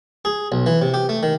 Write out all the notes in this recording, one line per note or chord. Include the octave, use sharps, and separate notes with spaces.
G#4
B1
E3
C3
G4
A3
D#3